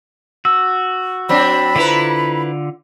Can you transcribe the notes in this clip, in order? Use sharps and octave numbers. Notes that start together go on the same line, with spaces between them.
F#4 E6
F#3 C4 D4 B5
D3 E4 F4 B4 A#5